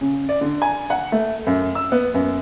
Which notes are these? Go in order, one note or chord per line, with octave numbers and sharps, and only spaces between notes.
C#3
D5
D3
G#5
F#5
A3
F#2
E6
B3
F#2